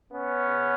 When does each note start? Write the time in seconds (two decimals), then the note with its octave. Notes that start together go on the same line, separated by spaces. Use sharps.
0.11 B3 C#4
0.45 C#3